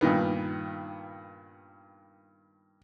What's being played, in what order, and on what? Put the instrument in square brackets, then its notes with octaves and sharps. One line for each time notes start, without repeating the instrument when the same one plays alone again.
[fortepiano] G2 A#2 D#3 B3